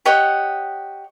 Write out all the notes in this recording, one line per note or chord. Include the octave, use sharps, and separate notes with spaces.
G4 C#5 D#5 F#5